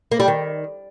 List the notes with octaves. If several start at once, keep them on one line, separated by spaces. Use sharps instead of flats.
A#3
G3
D#3